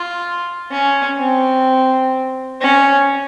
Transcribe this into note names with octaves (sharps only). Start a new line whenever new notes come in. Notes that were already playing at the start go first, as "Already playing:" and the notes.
Already playing: F4
C#4
C4
C#4